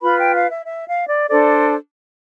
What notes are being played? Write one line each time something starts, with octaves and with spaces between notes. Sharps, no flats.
F4 B4 B5
G5
F5
E5
E5
F5
D5
D4 A4 C5 D5